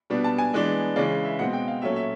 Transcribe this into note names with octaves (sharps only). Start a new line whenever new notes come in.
B2 G3 B3 D4
A5
G#5
E3 G#3 B3 D4
C#3 E3 G#3 D5
E5
B2 G#3 C4 F#5
G5
F5
A#2 F#3 A3 C#4 E5
E5